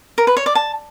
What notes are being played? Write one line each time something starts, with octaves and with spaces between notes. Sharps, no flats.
A#4
B4
C#5
D5
A5